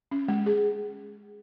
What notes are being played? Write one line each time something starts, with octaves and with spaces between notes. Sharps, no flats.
C#4
G#3
G#4